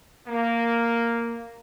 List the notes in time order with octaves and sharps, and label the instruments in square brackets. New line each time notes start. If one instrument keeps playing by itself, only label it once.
[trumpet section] A#3